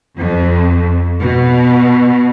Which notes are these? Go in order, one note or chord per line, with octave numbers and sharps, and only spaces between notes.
F2
B2